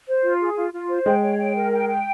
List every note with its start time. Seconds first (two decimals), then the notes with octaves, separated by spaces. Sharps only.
0.08 C5
0.24 F4
0.40 G#4
0.56 F4
0.73 F4
0.89 C5
1.06 G#3 G5
1.22 C#5
1.39 G5
1.55 A#4
1.72 G5
1.89 G5